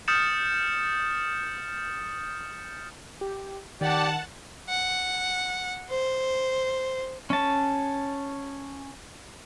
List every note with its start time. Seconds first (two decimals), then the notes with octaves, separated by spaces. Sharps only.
0.08 D#6 F6 G6 A6 C#7 E7
3.21 G4
3.81 D#3 G4 D5 F#5 A5
4.69 F#5
5.90 C5
7.30 C#4 A5